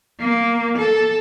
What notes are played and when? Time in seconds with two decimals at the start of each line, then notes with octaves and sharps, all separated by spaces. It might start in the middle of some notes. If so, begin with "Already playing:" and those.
0.20 A#3
0.78 A4